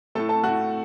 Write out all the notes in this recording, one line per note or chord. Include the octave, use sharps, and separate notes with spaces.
A2 A3 A4 A5
A4 A5
A2 A3 F#4 F#5